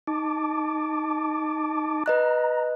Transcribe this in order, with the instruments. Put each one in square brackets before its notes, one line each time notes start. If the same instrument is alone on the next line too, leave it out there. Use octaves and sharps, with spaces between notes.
[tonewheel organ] D#4 A5 D6
[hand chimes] B4 D#5 F#6 [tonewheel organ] A#5